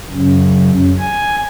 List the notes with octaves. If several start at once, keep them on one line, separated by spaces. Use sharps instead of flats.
F#2 C#3
G#5